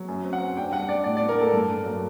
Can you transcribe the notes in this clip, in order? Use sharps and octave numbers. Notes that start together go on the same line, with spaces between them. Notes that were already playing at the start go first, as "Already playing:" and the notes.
Already playing: F#3
F#2
C4
F#5
C4
D4 G5
G3 F#5
D4 D5
A2 D5
D5
D4
A#4
A#3 A4
G2
A#3
F#3